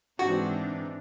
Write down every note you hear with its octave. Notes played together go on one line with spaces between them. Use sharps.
G#2 E3 C4 D4 D#4 F#4